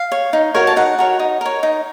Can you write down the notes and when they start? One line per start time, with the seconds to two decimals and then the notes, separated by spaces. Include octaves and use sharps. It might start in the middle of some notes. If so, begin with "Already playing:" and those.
Already playing: F5
0.12 C#5
0.33 D#4
0.54 F#4 A#4 C#5
0.67 A5
0.76 D#4 F#5
0.98 F#4 A#4 C#5
1.19 D#4
1.41 A#4 C#5
1.63 D#4